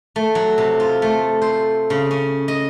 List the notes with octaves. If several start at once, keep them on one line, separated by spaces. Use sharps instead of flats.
A3
F#3
C3
F4
A3
C5
C#3
C#4
D#5